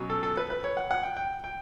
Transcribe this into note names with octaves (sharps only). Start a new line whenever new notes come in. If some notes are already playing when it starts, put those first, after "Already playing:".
Already playing: B2 F#3 C#4
A4
A4
B4
B4
C#5
F#5
F#5
G5
G5
G5